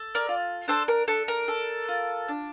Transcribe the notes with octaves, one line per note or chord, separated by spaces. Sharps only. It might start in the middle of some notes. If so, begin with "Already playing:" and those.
Already playing: A4
A#4 D5
F4
D4 A4 C5
A#4
D4 A4
A#4
A4
F4
D4